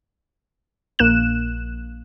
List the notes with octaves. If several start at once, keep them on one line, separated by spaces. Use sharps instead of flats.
A#1 A#3 F#6 E7